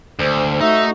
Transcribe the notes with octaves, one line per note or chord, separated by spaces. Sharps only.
D2 C5
A3 D#4 F#4 E5